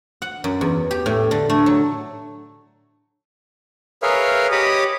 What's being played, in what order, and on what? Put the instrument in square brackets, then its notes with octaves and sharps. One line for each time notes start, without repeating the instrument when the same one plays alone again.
[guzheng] F#5
F#2
E2
G4
A2
D3
A3
F#3
[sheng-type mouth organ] G#4 A#4 B4 C#5 E5 F5
G4 C#5 D#5 B5 D6 D#6